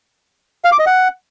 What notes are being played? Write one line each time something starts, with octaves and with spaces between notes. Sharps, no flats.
F5
D6
D#5
F#5